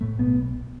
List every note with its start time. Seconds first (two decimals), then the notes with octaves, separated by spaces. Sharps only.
0.01 A2 A3
0.19 B1 B3